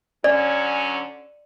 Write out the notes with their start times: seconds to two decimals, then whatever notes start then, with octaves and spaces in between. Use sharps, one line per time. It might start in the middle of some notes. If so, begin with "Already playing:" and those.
0.24 D3 F#3 C#4 D5